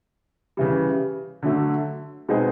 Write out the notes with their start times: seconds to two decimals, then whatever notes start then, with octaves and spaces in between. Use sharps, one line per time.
0.57 C#3 E3 G3
1.43 D3 F#3 A3
2.28 B2 G#3 C4 D#4 G#4